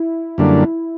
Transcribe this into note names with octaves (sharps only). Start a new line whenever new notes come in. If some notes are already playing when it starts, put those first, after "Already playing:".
Already playing: E4
F#2 D3 G3 A#3 D4